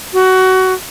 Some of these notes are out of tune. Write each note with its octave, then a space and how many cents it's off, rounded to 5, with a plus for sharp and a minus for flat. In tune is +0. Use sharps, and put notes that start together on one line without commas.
F#4 +20